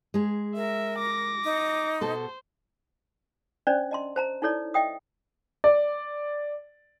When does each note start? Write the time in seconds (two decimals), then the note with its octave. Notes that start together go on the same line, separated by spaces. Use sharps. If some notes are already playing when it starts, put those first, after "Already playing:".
0.14 G#3 G#4
0.56 A#4 E5
0.98 D6 A#6
1.44 D#4
2.01 B2 A4 C5
3.67 C#4 D4 C5 D5
3.91 D#5 A5 C6
4.16 C5 A5 A#5
4.42 D#4 E4 A4 C#5 D5
4.74 D#5 E5 G5 D#6
5.64 D5